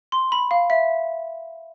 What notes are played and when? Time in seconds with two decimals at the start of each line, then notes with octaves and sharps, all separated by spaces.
0.12 C6
0.32 B5
0.51 F5
0.70 E5